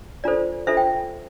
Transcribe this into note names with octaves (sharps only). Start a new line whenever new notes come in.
D4 F4 A4 C5 D5
D4 F4 A4 C5 E5
G5